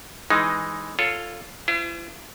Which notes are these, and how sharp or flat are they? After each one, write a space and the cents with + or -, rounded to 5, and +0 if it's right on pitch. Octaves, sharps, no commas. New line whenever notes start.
E3 +0 G#3 +0 D#4 +0
F4 +0 A4 +10 C#5 +0
E4 +45 C5 -40